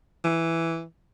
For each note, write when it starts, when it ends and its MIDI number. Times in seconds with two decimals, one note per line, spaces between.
0.24 0.84 52